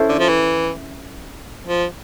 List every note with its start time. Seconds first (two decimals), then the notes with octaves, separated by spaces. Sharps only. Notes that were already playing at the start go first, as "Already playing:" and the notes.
Already playing: C#4 E4 A4 C5
0.08 D3
0.19 F3
0.28 E3
1.67 F3